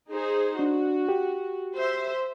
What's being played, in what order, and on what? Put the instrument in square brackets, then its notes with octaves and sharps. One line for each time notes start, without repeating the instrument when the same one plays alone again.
[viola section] D#4 G#4 C5
[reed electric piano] D4 [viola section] F#4
[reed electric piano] G4
[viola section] C5 E5